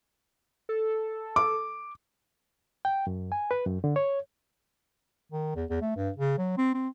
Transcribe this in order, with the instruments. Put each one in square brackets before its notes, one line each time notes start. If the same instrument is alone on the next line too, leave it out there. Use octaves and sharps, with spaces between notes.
[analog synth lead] A4
[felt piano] D6
[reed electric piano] G5
F#2
G#5
B4
F#2
D3
C#5
[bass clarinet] D#3
E2
E2
A3
G2
C#3
F#3
C4
C4